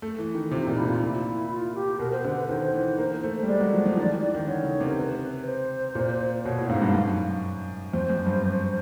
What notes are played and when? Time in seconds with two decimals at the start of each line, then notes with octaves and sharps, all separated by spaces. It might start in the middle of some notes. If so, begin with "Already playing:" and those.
0.02 A3
0.19 E3
0.35 D#3
0.51 C3 F4
0.63 A#2 D#4
0.76 E4
0.85 A#2 F4
1.01 E4
1.50 F4
1.75 G4
1.99 B2 A#4
2.12 C5
2.25 D3
2.37 B4
2.49 D#3 C5
2.74 E3
2.98 A#3
3.23 A3
3.43 G3
3.48 G#3 D5
3.60 F#3
3.73 F3
3.86 F3
3.97 D#3
4.10 E3
4.23 E3
4.34 D#3
4.47 D3 C#5
4.64 C#3
4.80 C3
4.87 A#4
4.96 B4
5.21 B4
5.46 C5
5.95 A#2
6.45 B2 C#5
6.58 A2
6.69 G#2 F5
6.82 G2
6.94 F#2
7.93 F2 C5
8.10 F#2
8.26 G2